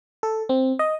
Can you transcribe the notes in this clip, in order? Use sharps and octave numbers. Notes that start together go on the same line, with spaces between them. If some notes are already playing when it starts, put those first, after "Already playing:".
A4
C4
D#5